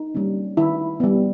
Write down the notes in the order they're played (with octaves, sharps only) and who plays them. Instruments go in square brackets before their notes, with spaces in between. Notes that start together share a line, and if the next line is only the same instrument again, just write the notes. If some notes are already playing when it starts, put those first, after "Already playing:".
Already playing: [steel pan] D#4
G3 A#3 C#4
D#3 E4
G3 B3